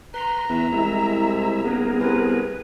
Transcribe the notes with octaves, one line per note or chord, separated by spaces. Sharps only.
B4 A#5 C6
E2 B4 E5
C2 G#3 E4 E5
D#1 B3 G#4 A#4
C2 B4